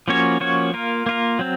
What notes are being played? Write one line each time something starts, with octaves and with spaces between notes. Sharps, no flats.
F3 A#3 C#4 F#4 C#5
F3 A#3 C#4 F#4 C#5
A#3 F4 A#4
A#3 F4 A#4
F#3 C4